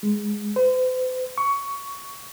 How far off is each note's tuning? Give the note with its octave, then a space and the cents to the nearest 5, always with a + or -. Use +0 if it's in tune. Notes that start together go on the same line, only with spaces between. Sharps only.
G#3 +0
C5 -45
C#6 +15